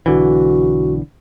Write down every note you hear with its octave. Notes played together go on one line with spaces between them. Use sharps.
B1 D3 E3 F#4